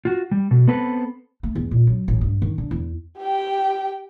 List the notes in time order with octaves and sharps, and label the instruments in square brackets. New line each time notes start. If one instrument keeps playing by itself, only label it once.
[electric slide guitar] F4 F#4
G3
B2
B3 C4 A4 B4
[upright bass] A3
E2
A#2
F#3
A1
G2
D#3
D3
E2
[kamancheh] G4 G5